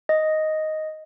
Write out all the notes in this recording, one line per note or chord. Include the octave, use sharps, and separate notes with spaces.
D#5